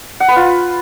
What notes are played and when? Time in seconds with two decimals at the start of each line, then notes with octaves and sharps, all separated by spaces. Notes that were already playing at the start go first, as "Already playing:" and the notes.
0.20 F#5
0.28 B4
0.36 F4